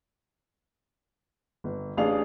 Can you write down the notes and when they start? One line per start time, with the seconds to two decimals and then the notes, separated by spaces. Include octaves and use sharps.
1.64 G1
1.97 A1 D4 G#4 F5 F7